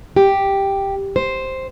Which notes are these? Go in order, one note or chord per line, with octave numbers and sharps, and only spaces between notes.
G4
C5